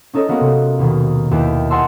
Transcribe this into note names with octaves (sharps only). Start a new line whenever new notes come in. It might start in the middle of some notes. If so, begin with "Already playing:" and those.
C#4 D#4 A4 C#5 D#5
A#3 B3 D#4 F#4 A#4
C3
D#2 B2 D#3
D#2 E4 B4 G5
D#5 F#5 G#5 A5 C6 E6